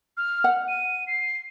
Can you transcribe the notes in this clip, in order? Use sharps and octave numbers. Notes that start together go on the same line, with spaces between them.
F6
F#5
D#7
C7